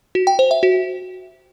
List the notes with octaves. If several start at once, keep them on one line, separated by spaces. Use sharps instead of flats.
F#4
G5
C5
E5
F#4